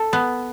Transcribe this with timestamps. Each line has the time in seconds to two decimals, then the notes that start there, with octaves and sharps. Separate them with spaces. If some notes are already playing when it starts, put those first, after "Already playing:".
Already playing: A4
0.13 B3